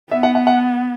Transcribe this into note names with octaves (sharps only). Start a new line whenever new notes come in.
B3 E5
F#5
F#5
F#5